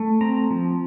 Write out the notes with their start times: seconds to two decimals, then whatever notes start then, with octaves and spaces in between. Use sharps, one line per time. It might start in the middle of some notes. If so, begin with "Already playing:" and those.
Already playing: A3
0.21 C4 A#5
0.51 F3